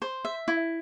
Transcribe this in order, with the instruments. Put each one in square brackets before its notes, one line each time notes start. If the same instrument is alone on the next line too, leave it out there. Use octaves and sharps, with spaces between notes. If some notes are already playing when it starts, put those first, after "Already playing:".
[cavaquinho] C5
E5
E4